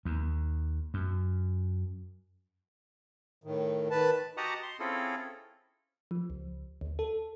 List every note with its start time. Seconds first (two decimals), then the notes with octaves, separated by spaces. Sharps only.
0.05 D#2
0.94 F#2
3.44 A2 D#3
3.91 D#3 B4 A5
4.37 F#4 G4 D#5 F#5 A5 A#5
4.63 C6
4.80 C4 C#4 E4 F4 G#4 A4
6.11 F3
6.30 C#2
6.81 D2
6.99 A4